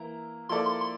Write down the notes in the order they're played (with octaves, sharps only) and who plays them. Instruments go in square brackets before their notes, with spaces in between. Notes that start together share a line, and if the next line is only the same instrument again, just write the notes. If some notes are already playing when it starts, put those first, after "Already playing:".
Already playing: [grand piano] E3 A#3 E4 [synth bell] A#5
[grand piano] F3 A#3 E4 A4 D5 [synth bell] C6
[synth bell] C6
C6